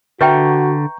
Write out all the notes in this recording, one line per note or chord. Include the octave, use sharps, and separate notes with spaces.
D3 F#4 B4 E5 G5 A#5 C#6 G6